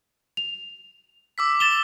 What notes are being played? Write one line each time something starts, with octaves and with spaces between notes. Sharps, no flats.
F7
D6 E6 B6
A6 E7 F7 G7